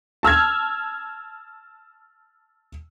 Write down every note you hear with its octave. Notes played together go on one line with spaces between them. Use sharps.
A5 E6 F6 G#6